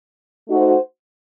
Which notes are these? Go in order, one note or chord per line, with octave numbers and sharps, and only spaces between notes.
A3 D#4 F#4 C5